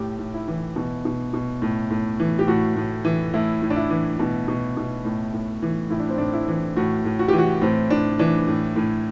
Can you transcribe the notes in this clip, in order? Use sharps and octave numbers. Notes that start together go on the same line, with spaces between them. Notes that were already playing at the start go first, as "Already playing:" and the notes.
Already playing: A2 G4
A2
E4
E3
B2
B2
B2
A2
A2
E3
G4
A2 F#4
A2
E3
A2 E4
A2
D4
E4
E3
B2
B2
B2
A2
A2
E3
A2 E4
D4
C4
A2 D4
E4
E3
A2 F#4
A2
F#4
G4
E3
F#4
A2 C4
A2 D4
E3 D4
A2
A2